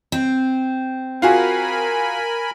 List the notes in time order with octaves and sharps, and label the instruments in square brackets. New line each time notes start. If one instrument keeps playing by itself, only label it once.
[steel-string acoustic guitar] C4
[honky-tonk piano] F4 F#4 G#4 [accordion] A#4 G#5 B5